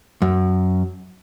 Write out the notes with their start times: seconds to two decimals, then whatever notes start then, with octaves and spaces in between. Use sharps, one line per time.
0.22 F#2